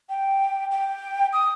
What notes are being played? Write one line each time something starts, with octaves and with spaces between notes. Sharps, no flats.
G5
G5
D#6